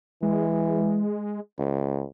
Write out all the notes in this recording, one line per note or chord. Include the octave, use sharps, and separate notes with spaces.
E3 G#3
C#2